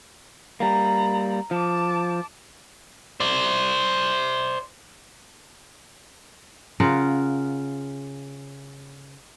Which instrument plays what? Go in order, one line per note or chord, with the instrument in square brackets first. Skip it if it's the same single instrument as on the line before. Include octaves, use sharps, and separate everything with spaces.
[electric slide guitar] G3 A#3 [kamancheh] A#5 B5
[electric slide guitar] F3 [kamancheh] A5 D6
[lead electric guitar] C5 D5
[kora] C#3 F4 A#4 F#5